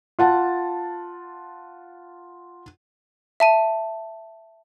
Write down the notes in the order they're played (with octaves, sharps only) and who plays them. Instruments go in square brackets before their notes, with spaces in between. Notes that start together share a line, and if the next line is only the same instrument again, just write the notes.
[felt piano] F4 F#5 A5
[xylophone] E5 A5 D#7